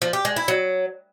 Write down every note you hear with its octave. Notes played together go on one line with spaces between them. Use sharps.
F3
G4
G#3
E4
F#3